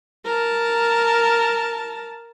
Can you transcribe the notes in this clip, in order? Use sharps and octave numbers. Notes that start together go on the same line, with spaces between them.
A#4 A5